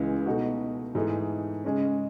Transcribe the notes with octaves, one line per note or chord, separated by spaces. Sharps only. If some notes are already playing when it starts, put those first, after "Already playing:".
Already playing: C#2 C#3 E3 G#3
B2 A3 D#4 F#4
G#2 E3 A3 D#4
C#3 G#3 C#4